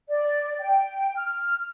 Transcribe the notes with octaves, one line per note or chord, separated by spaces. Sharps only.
D5
G5
F6